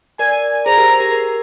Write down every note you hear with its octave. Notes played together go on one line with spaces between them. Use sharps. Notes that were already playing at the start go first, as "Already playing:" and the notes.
A#4 D5 G#5
G#4 C5 A#5
G4 A#4
G4 A#4
G4 A#4